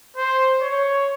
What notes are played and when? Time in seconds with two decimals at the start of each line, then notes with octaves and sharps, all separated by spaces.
0.16 C5
0.61 C#5